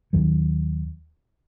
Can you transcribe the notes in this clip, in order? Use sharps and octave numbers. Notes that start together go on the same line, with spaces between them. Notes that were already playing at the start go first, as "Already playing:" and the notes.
D#2 D#3 F#3